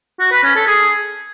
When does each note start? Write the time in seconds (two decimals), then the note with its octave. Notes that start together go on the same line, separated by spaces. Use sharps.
0.20 F#4
0.32 B4
0.43 C#4
0.55 A4
0.67 G#4